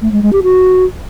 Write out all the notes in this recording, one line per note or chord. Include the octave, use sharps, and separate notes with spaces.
A3
G#3
G#3
G4
F#4